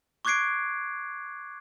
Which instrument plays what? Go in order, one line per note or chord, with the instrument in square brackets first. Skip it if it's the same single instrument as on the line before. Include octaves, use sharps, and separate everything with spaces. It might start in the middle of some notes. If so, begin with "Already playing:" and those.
[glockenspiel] C#6 D6 F#6 G#6 C7 D7